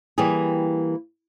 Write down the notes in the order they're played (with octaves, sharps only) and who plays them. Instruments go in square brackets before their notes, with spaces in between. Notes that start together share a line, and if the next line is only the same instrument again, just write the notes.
[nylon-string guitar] E3 G3 A#3 G4 G#4